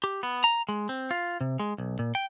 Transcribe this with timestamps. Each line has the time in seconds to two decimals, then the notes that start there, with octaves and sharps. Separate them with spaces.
0.04 G4
0.23 B3
0.44 A#5
0.69 G#3
0.89 C4
1.11 F4
1.41 C3
1.60 G#3
1.78 B1
1.99 A#2
2.15 G5